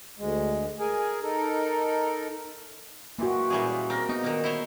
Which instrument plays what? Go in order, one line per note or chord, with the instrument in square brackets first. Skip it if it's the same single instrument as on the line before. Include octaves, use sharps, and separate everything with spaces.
[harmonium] D2 G#3
G#4 A#4 G#5
D#4 A4 A#4
[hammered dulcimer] E3 G#3 G4 [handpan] A#3 F#4
[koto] A#2 G3 G#4 [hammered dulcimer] E3 C#4
[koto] C4 [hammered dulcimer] A#4 F5
[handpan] B3 [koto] D#4 [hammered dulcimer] F#4
[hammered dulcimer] A#2 [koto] D#3 A#3
[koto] E4 C5 C#5